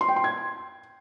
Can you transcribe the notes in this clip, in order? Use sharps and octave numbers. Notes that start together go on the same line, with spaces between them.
C6
G5
C6
G#6